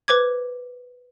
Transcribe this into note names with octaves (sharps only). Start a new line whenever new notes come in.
B4 C5 D6 G#6